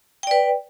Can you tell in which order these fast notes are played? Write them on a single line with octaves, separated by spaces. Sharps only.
G5 D5 B4